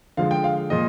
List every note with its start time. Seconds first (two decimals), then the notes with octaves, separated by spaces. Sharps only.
0.17 D3 F3 G#3 F5
0.31 G5
0.44 F5
0.70 A#2 F3 G#3 D#5